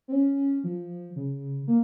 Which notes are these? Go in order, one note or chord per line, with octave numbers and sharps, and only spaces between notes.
C4
C#4
F3
C#3
A#3